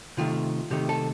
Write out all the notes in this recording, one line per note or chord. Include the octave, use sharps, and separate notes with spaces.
C3 D#3 A3 F4
C3 D#3 A3 G4
A4